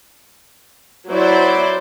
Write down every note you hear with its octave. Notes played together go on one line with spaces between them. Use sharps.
F#3 E4 C5 D5